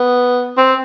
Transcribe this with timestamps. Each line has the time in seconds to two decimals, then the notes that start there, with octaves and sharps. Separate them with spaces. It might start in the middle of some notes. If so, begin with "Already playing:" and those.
Already playing: B3
0.57 C4